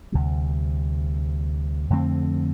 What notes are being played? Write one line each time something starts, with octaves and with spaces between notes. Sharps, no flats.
D2 C3 G3
F2 D3 A3 C4